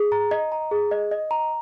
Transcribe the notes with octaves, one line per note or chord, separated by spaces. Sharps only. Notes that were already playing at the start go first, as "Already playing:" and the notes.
Already playing: G#4
A#5
D#5
A#5
G#4
D#5
D#5
A#5